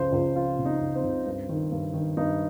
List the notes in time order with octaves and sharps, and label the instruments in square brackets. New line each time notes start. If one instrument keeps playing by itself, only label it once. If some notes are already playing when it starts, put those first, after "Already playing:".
Already playing: [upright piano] C#2 C#3 F3 C5
C#2
F3 F4
C#3
D#4
C#2
C4
C#2
G2
D#3
G2
D#3
G2 D#4